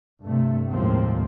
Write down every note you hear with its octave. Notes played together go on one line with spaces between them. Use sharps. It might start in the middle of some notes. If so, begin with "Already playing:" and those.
G2 C3 A3
D#2 A2 F3 G#3 A#3 C4